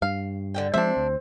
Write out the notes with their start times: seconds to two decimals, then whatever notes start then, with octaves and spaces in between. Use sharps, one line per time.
0.02 G2 F5
0.54 D3 F#4 G5
0.74 F3 G#3 C4 D4 E5
0.97 D2